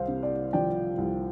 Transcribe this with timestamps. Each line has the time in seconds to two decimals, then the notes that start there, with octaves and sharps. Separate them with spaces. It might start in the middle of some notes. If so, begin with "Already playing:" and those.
Already playing: C2 C5 F5
0.08 C3
0.23 D5
0.53 F3 D5 G5
0.98 C2